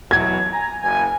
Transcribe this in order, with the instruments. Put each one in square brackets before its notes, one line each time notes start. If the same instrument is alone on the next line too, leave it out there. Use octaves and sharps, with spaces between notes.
[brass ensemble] B2 E3 F#3 [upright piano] G#6
[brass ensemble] G#5 A#5
F#1 G#5